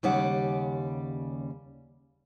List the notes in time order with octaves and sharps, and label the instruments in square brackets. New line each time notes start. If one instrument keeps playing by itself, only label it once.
[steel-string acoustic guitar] D#2 C#3 G3 D5 F#5